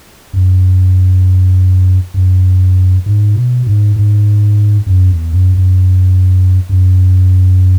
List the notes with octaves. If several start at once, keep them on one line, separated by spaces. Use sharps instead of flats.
F#2
F#2
G#2
B2
G#2
G#2
F#2
E2
F#2
F#2
F#2